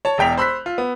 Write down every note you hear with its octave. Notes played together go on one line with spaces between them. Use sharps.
C#5 A5
E1 E2 G5 B6 F7
C5 B5 E6 F#6 B6
F4
B3